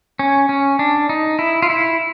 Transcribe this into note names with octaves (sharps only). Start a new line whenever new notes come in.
C#4
C#4
D4
D#4
E4
F4
E4